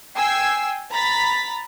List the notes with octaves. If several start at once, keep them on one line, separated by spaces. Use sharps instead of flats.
G5 G#5 E6 G#6 C7
A#5 B5 A6 B6